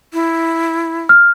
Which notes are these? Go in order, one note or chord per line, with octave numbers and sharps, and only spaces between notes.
E4
F6